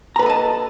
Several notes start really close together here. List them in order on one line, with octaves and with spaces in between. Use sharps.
A#5 B4 A4 D#5 A5